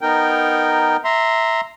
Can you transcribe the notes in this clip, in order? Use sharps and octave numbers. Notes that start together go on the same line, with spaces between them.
B3 D#4 A#4 G5
E5 A#5 C6